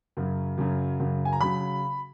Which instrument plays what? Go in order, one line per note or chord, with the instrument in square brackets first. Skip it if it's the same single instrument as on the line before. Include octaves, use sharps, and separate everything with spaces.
[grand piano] F#2 C#3 F#3
F#2 C#3 F#3
F#2 C#3 F#3
G#5
A#5
C#3 F#3 B5